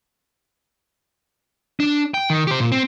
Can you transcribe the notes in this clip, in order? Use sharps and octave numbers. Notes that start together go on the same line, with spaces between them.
D4
G5
D#3
G4 C5
A#2
C4